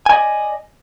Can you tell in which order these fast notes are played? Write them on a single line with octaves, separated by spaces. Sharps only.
G#5 D5 D#5